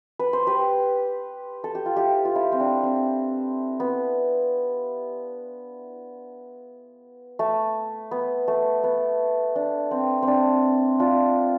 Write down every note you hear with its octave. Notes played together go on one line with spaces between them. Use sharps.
B4
C5
G4 B4
A4
G4
F4
E4 G4
F4
E4
C4
D4
C4
B3
A3
B3
A3
B3
D4
C4
C4 D4
D4 F4